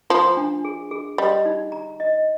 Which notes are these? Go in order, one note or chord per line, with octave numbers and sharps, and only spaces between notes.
F3 F4
D4
G#4
G#4
G3 D#5
D#4
A#5
D#5